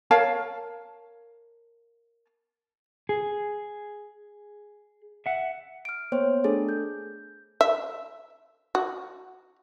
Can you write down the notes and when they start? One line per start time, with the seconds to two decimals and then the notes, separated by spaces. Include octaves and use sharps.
0.11 A#4 C#5 F5 A5
3.09 G#4
5.26 E5 F#5
5.85 F6 D7
6.12 A#3 B3 C5 C#5 G5
6.44 A3 D4 G#4 A4
6.69 G6
7.61 E5
8.75 F#4